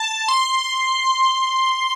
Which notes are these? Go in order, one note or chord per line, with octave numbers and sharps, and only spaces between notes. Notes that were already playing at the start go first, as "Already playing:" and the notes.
Already playing: A5
C6